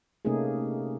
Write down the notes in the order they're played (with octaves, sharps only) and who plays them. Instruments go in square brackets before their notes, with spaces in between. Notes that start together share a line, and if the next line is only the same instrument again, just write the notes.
[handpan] C3 A3 A#3 C#4 D#4 G#4